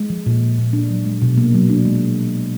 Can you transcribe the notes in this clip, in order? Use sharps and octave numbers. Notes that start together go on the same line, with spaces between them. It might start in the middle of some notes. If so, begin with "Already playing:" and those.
Already playing: G#3
F3
A#2
F3
A#2
D4
F#3
G#3
B2
A#3
F#3
D4
G#3